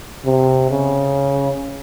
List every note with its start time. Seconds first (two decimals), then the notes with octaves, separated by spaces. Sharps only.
0.25 C3
0.70 C#3